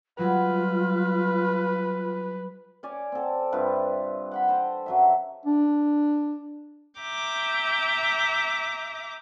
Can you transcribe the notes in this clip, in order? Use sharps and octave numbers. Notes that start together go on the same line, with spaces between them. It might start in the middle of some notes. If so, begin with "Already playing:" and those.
F#3 G3 F4 B4
C#4 C#5 D5 G#5
C4 A4
G2 C3 F4 B4
F#5 G5 B5
A4 C5 G5
F#2 F#3 E5
D4
E5 G5 A#5 D6